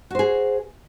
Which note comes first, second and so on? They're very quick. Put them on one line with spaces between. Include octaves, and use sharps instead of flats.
F#4 C5 G#4